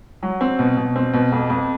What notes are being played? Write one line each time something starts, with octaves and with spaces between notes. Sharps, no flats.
F#3
C4
B2
B2
C4
B2
F2
F2